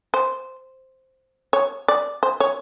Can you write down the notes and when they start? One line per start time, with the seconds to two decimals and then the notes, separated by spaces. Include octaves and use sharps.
0.14 C5
1.53 C#5
1.88 D5
2.23 C5
2.40 C#5